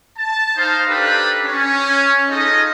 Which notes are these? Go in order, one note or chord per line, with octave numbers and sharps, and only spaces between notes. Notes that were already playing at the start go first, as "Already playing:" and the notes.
A5
D#4 C5 F5
D4 G4 A4 B4 A#5 B5
C#4
D#4 F4 G#4 A4 D#5